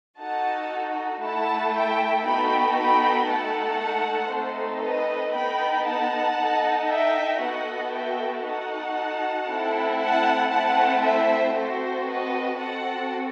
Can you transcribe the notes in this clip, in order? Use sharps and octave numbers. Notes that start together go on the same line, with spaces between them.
D#4 F#4 A4 F#5 A5
A3 E4 A4 F#5 A5
E5 G5
B3 D#4 F#4 A4 G5 B5
G5 B5
A3 D#4 A4 F#5 A5
A3 C4 D#4 A4 C5
B4 D#5
B3 D#4 A4 G5 B5
F#5 A5
D#4 A4
E5 G5
B3 F#4 A4 D#5 F#5
E5 G5
D#4 F#4 A4 F#5 A5
A3 C4 E4 A4
F#5 A5
A3 C4 E4 F#5 A5
C5 E5
C4 F#4 A4 C5
B4 D#5
C4 F#4 A4 F#5 A5